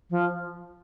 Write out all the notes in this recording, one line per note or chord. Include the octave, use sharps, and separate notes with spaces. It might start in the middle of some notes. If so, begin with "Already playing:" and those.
F3